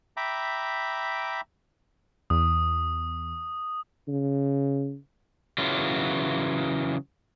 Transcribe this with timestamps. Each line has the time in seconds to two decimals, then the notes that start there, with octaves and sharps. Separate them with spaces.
0.17 E5 G5 A#5 B5 D6
2.30 E2 D#6
4.09 C#3
5.58 C#3 E3 F#3 F4